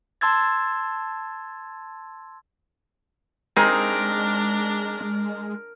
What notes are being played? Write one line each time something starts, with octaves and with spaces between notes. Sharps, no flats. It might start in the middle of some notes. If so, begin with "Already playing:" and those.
A5 C6 E6 G#6 A6
G#3 C4 D4 D#4 G#4 A#4 A#5